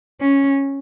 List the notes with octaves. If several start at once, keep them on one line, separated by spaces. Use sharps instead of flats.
C#4